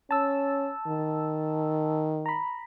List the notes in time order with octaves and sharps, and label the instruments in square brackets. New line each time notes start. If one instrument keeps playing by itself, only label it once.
[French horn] C#4 [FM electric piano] A5 E6
[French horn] D#3
[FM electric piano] A#5 B5